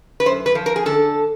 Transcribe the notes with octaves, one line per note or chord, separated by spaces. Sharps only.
B4
F#2 C5
B4
F3
A#4
G#4
D3 A4